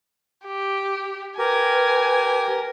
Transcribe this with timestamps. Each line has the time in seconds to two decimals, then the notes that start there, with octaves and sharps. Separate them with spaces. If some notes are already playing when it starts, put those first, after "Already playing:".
0.45 G4
1.39 G4 A#4 B4 G#5